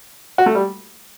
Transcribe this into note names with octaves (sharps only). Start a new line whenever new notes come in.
F#4
A3
G3